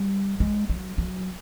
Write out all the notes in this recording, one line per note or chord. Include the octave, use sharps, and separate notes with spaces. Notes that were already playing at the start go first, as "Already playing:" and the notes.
Already playing: G3
G#3
F#3
F#3